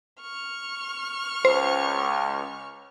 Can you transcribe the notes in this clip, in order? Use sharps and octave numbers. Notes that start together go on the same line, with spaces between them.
C#6 F6
C#2 C5